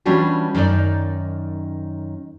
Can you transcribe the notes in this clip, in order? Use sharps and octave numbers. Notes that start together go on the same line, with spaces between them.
E3 G3 C#4 D4 F4 F#4
F#2 D#3 D#4 A#4 D5